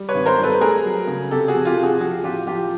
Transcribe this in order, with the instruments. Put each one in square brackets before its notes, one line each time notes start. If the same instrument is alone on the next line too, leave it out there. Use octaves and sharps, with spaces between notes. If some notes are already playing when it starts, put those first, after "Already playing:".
Already playing: [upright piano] G3
B4 C#5
G#1
A#4 C5
G3
A4 B4
A3 G#4 A#4
F#3
C#3
C3 G4 A4
F#4 G#4
F2
F4 G4
C3
F#4 G#4
F3 F#4 G#4
A1 F4 G4
F3 F4 G4